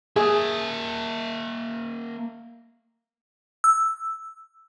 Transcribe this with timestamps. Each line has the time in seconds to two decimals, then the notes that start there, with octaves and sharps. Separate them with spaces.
0.16 A#3 G#4 E5
3.64 E6